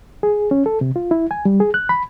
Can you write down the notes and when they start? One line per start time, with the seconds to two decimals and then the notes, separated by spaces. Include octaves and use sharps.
0.23 G#4
0.51 C#4
0.66 A4
0.81 C3
0.96 F4
1.11 E4
1.31 G#5
1.45 G3
1.60 G#4
1.74 F#6
1.89 B5